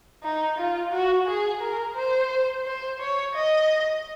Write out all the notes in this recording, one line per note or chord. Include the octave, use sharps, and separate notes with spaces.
D#4
F4
F#4
G#4
A#4
C5
C5
C#5
D#5